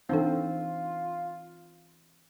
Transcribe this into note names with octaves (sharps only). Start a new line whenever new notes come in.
E3 C4 D4 D#4 F4 A4